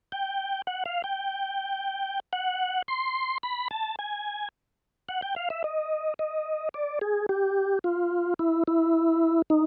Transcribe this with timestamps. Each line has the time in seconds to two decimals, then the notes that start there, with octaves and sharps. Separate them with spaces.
0.12 G5
0.67 F#5
0.86 F5
1.04 G5
2.33 F#5
2.88 C6
3.43 B5
3.71 A5
3.99 G#5
5.09 F#5
5.22 G5
5.36 F5
5.50 E5
5.64 D#5
6.19 D#5
6.74 D5
7.01 G#4
7.29 G4
7.84 F4
8.39 E4
8.67 E4
9.50 D#4